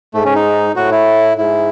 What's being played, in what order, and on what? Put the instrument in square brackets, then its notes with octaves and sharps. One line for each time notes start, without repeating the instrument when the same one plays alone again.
[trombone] G#2 [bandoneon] A3
[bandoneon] C#4
D#4
[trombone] A2 [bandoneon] F#4
[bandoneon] E4
[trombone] G#2 [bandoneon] E4